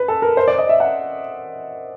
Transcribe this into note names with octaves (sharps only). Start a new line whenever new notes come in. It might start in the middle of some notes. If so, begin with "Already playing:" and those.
Already playing: B4
A4
A#4
C5
D5
D#5
E5
F#5